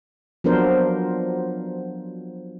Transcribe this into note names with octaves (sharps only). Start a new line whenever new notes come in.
F3 F#3 B3 D4 A#4 C5